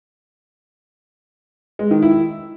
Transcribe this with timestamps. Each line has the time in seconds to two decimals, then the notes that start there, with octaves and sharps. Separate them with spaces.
1.79 G#3
1.91 D#3
2.02 E4